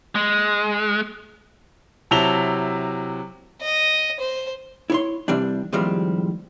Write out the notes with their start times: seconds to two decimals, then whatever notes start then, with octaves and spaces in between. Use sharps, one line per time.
0.15 G#3
2.11 C3 F#3 E4 A5 F7 G7
3.62 D#5
4.20 C5
4.90 E4 C#5 C6
5.28 C3 E3 G3 C4 D4
5.73 D#2 A2 F3 G3 G#3 C4